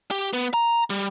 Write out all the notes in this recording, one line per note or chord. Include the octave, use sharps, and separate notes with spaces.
G4
B3
A#5
G3